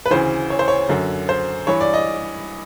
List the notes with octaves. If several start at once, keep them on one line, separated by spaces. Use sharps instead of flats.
B4
D2 C#3 E3 C5
C#5
C5
C#5
F#2 D3
C5
G2 E3 C#5
D5
D#5